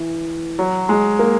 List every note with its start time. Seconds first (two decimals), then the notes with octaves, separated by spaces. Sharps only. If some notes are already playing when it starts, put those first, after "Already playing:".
Already playing: E3
0.59 F#3
0.89 G#3
1.19 A#3